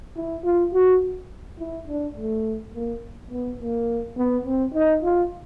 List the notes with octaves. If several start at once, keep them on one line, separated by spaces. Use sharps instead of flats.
E4
F4
F#4
E4
D4
A3
A#3
B3
A#3
B3
C4
D#4
F4